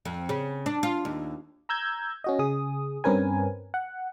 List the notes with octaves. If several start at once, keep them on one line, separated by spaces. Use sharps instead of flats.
F2
C#3
D4
F4
D#2
A#5 E6 G6 G#6
C#4 F#4 D#5
C#3 G#4 D#6
G2 C4 C#4 A#4 B4 G#5
F#5